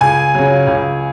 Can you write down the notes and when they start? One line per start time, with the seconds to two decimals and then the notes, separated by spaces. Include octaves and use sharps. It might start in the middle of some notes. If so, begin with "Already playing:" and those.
0.01 C#2 G#5
0.34 C#3 F#3
0.67 C#2